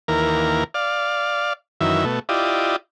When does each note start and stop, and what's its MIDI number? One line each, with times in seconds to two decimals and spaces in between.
0.08 0.64 39
0.08 0.64 52
0.08 0.64 58
0.08 0.64 70
0.74 1.53 74
0.74 1.53 77
1.81 2.05 42
1.81 2.05 51
1.81 2.05 52
1.81 2.05 76
2.05 2.19 47
2.05 2.19 57
2.29 2.76 64
2.29 2.76 65
2.29 2.76 67
2.29 2.76 74
2.29 2.76 75